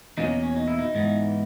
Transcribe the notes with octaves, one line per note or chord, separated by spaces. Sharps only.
E2 B2 A#3 C#4 D#4
C#4
D#4
E4
D#4
G#2 E3 B3